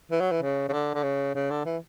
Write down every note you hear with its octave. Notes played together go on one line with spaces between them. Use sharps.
E3
F#3
E3
C#3
C#3
D3
D3
C#3
C#3
D3
E3